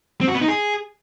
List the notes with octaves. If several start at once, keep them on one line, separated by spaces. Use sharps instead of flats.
C4
F#4
B3
D#4
G#4